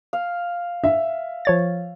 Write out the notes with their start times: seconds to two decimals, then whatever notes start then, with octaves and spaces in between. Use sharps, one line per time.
0.13 F5
0.84 E5
1.45 F3 C#5 A6